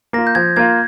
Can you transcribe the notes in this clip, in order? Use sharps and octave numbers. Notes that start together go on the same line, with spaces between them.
A#3 F4 A#6
G6
F3 G#6
A#3 F4 G#6